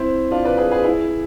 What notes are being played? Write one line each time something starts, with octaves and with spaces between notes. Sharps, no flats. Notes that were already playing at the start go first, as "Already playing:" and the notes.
Already playing: C4 E4
D4 F4
B4 D5
G#4 B4
G#4 B4
E4 G#4